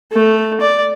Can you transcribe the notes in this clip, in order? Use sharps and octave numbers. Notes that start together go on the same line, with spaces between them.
A3
D5